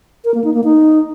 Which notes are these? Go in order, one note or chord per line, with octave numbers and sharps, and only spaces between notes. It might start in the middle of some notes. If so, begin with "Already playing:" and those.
A#4
A#3
D#4
A#3
D#4